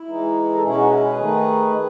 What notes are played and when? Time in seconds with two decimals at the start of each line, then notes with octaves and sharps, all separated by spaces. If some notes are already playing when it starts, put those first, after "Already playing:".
Already playing: E4
0.08 E3 G#3 D#4
0.55 A4
0.63 B2 G#3 C#4 E4 G#4
0.77 D#4 F#4
0.90 E4
1.04 G#4 B4
1.19 D#3 A3 D#4
1.73 D#3